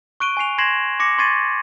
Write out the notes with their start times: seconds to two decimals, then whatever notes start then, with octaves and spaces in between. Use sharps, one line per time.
0.20 C#6 F#6 D7 D#7 G7
0.37 G#5 C#6 C7 F7
0.58 C6 G#6 A#6 C7 E7 F#7
1.00 D6 A#6 C#7
1.18 C6 C#6 G#6 A6 C7 D#7